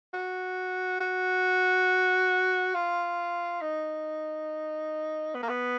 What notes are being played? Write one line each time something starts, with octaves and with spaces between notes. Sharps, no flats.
F#4
F#4
F4
D#4
B3
A#3
B3